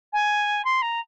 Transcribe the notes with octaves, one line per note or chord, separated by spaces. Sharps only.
G#5
C6
A#5